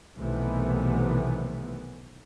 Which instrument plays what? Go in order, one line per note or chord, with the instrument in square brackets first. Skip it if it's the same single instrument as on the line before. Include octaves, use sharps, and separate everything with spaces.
[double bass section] B1 C3 D#3 E3 A3 B3